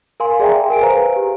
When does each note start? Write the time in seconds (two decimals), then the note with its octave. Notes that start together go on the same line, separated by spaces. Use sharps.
0.20 A#4 F5 G#5 C6
0.40 G#4 D5 E5 G5 A#5
0.69 G#4 A#4 G#5 D7
0.82 B4 C5 F5 A#5
1.16 G4